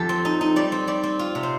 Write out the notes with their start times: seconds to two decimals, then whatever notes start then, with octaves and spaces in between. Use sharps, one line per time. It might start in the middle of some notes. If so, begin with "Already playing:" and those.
Already playing: F2 G4 A4
0.09 C4
0.25 D#4
0.41 D#4
0.56 G3 D5
0.72 C4
0.87 G3 D5
1.03 C4
1.19 F4
1.35 C3
1.43 C5